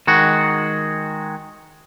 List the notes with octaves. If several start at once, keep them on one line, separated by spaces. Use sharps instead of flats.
D#3 G#3 F#4